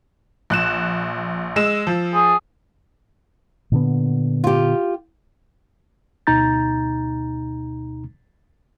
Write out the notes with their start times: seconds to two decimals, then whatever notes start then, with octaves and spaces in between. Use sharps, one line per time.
0.50 A#1 F#6 E7
1.56 G#3 E6 E7
1.87 F3
2.14 G#4
3.72 A#2 D3 B3
4.44 F4 G4
6.27 D2 B2 D#4 A#5 G6 A6